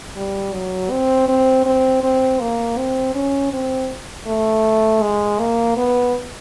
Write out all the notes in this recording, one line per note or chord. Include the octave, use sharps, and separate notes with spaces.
G3
F#3
C4
C4
C4
C4
A#3
C4
C#4
C4
A3
G#3
A#3
B3